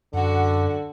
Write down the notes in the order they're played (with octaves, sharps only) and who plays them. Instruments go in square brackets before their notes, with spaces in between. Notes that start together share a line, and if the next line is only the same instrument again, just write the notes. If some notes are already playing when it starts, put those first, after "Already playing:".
[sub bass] F#2 [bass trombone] D3 [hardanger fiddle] F#4 F#5